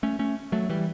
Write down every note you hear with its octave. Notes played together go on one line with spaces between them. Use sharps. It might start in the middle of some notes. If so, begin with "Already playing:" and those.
A3 C#4
A3 C#4
F#3 A3
E3 G3